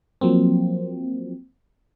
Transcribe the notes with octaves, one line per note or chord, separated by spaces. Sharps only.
F3 F#3 A#3 C4